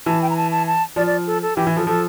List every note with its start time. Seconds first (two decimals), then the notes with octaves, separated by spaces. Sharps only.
0.06 E3 A5
0.22 G5
0.30 A#5
0.37 A5
0.51 A5
0.67 A5
0.96 F3 D5
1.06 D5
1.27 A4
1.42 A4
1.57 E3 G4
1.67 E3
1.77 F3 A4
1.87 F3 A4